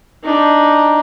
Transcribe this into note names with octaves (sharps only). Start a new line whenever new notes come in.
D4 D#4